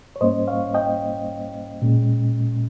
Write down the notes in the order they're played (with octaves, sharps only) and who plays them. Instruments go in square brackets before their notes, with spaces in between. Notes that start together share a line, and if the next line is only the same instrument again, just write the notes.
[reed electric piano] C#5
G#2 G3 A#3 C#4 C5 D#5
C#5 F5
D#5 G5
A#2 G#3 C#4